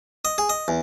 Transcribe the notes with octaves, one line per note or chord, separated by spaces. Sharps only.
D#5
G#4
D#5
E2